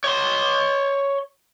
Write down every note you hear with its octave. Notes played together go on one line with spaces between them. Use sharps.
C#5 C6